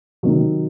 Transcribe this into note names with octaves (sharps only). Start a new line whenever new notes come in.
C3 D#3 F#3